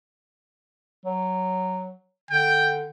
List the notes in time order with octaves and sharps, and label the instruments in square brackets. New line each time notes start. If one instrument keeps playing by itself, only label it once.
[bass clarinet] F#3
[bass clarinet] D3 [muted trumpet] G5